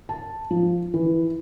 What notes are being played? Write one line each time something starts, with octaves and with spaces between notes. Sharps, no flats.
A5
F3
E3